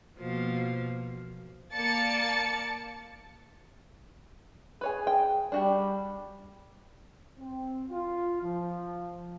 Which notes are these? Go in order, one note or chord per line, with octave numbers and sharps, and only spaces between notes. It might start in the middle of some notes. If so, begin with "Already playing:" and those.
B2 F3 A#3
A#3 D5 A5 A6 C#7
G#4 B4 C#5 G#5
G5
G3 D4 F#4 G4
C4
F4
F3